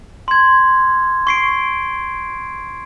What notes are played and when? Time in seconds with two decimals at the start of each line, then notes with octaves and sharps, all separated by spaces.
0.28 C6 G#6
1.27 C#6 C7 D7